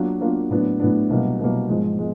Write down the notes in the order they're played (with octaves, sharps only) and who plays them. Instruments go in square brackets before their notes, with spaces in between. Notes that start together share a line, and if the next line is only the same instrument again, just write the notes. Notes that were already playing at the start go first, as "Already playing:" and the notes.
Already playing: [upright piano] F#3 A#3 D4 F4
F#3 A#3 D4 F4
A2 F#3 B3 D4
A2 F#3 B3 D4
C2 B2 F#3 A#3
C2 B2 F#3 A#3
G#2 F3 G#3
F3 G#3